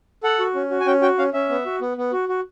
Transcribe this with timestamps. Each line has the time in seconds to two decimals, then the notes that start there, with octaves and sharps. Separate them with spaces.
0.23 A4 F#5
0.40 F#4
0.55 C#4
0.70 F#4
0.80 G#5
0.86 C#4 G5
1.02 F#4 G5
1.18 C#4 F5
1.33 C#4 E5
1.50 B3
1.66 F#4
1.81 B3
1.97 B3
2.12 F#4
2.29 F#4